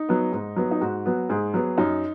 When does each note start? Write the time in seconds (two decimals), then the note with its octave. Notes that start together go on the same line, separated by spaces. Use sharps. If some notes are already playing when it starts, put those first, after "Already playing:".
Already playing: D#4
0.09 F#3 B3
0.33 G#2
0.56 F#3 B3
0.71 D#4
0.81 G#2 F#4
1.06 F#3 B3
1.29 G#2 G#4
1.54 F#3 B3
1.78 F#2 D#4